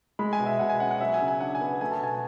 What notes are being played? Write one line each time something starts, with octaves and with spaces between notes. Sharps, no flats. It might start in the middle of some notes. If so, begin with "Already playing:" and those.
G#3 B5
G#5
B2
E5
B2 F#5
G#5
C#4 F#5
F#5
F#3 E5
G#5
C#3
G#5
D4 F#5
G#5
B3
A3 G#5
A5
B2 G#5